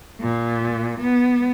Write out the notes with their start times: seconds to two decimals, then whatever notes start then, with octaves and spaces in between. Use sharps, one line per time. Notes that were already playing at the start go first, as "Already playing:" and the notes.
0.22 A#2
1.01 B3